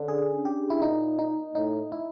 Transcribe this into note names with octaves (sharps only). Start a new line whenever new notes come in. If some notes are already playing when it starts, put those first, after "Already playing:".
Already playing: D3 C#4 D4
G#4
G4
E4
A#2 D#4
D#4
A2 D#4
E4